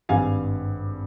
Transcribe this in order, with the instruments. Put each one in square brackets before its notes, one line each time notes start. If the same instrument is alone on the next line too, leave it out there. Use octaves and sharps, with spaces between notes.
[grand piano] G#1 G2 G3 F5 G#5